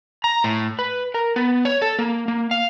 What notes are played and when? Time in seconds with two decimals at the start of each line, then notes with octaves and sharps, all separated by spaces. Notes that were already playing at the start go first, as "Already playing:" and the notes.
0.24 A#5
0.44 A2
0.79 B4
1.14 A#4
1.36 B3
1.65 C#5
1.82 A4
1.99 A#3
2.28 A#3
2.51 F5